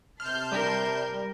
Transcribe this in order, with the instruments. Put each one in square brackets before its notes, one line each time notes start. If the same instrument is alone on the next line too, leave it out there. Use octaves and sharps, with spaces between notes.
[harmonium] C3 [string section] A5 C6 G6 [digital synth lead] F6
[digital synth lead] G3 [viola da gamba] A#4